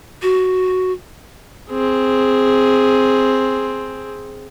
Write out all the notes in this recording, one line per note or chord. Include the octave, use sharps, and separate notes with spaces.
F#4
C4 G#4